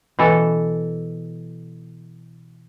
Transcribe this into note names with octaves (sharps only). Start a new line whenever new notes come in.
B2 E3 A4